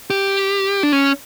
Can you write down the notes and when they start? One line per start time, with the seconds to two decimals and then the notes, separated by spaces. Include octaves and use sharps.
0.10 G4
0.83 D4
0.93 C#4